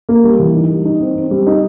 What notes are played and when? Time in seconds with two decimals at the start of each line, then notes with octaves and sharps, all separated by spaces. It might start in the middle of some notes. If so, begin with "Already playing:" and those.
0.09 A#3
0.24 G3
0.39 E3
0.55 D#4
0.70 G3
0.85 D#4
1.00 C4
1.16 C4
1.31 G3
1.47 D#4